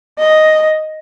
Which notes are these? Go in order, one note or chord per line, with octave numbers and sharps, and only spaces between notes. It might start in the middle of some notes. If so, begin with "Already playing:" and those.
D#5